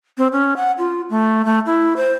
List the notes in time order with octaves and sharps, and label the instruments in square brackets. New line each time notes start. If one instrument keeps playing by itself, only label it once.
[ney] C4
C#4
F#5
F4
A3
A3
E4
C5